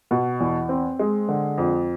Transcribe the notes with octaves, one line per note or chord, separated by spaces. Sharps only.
B2
E2
C4
G#3
D3
F2